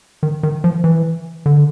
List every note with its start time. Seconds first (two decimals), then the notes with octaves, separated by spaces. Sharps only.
0.23 D#3
0.43 D#3
0.64 F3
0.84 E3
1.46 D3